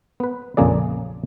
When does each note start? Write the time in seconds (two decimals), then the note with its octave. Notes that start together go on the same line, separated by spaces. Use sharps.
0.20 B3 B4
0.57 A#1 F2 C#3 A#3 G#4 D5